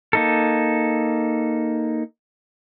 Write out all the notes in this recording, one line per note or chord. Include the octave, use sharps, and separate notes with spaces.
A#3 D#4 A4